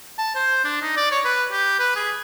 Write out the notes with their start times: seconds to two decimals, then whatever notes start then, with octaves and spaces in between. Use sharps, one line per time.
0.18 A5
0.35 C5
0.64 D4
0.82 D#4
0.97 D5
1.11 C#5
1.25 B4
1.52 G4
1.79 B4
1.96 G#4